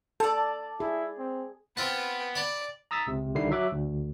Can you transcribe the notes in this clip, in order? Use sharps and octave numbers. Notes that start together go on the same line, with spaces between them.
A4 D5 A5
E4 G#4
C4
B3 C4 F4 B4 G5 A5
D5 A5 B5
A#5 D#6 E6 A6 B6
C#2 C3
C2 D3 D#3 G3 E4 C7
F#3 E5 D6 F#6
D2